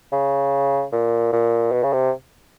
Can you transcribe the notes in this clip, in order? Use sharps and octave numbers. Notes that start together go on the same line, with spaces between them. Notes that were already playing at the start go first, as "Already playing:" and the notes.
C#3
A#2
A#2
B2
C#3
C3